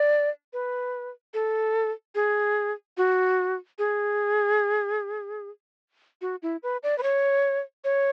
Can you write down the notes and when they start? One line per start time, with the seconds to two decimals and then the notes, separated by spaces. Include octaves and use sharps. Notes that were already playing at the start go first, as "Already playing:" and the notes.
Already playing: D5
0.53 B4
1.34 A4
2.15 G#4
2.97 F#4
3.79 G#4
6.22 F#4
6.42 E4
6.63 B4
6.83 D5
6.98 B4
7.03 C#5
7.84 C#5